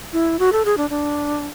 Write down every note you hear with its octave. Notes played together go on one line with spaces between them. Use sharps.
E4
F#4
A4
G#4
D4
D4